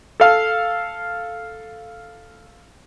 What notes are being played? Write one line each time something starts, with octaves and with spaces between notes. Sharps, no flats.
A4 F5